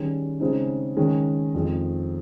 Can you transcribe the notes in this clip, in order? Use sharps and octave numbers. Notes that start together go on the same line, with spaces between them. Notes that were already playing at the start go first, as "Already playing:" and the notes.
Already playing: D#3 G3 C#4 G#4
C#3 G#3 C4 D#4
D#3 G#3 C#4
F2 D#3 G#3